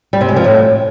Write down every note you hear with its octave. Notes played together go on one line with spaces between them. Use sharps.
G3
C3
G#3
F3
A2